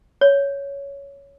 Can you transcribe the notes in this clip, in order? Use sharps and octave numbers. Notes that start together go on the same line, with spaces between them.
C#5